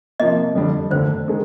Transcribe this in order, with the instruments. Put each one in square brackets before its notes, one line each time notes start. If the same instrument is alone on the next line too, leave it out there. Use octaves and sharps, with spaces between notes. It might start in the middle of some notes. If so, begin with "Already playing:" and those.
[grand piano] C3 F3 A#3 [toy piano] D#5
[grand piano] F2 D3 G3 D4
[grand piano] F1 D#2 D3 [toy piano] C5
[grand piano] D#3 G#3